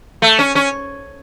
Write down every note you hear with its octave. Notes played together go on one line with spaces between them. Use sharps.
A3
C#4
C#4